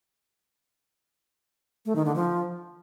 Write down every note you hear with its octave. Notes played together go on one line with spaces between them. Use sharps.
A3
D#3
D3
F3